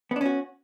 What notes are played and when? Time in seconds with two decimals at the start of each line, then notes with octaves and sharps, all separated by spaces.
0.11 B3
0.16 D4
0.21 C#4
0.26 F#4